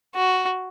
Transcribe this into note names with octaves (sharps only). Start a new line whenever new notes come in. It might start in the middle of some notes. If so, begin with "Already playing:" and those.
F#4